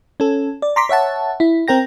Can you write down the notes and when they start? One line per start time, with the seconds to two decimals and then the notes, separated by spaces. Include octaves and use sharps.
0.20 C#4 A4
0.62 D5
0.76 A#5 C6 D6 B6
0.89 C#5 E5 F#5 A5
1.40 E4
1.68 C4 A#4 G5 A#6